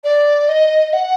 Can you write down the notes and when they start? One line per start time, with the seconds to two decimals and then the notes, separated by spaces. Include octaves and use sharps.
0.04 D5
0.48 D#5
0.93 F#5